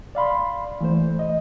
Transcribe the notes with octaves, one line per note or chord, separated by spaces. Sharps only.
D5 F5 B5 C6
E3 A3 C5
D#5